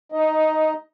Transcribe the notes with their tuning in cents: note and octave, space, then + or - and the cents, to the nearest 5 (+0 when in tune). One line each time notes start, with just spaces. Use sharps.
D#4 +0 D#5 +15